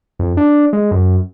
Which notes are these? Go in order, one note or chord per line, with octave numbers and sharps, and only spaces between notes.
F2
D4
G#3
F#2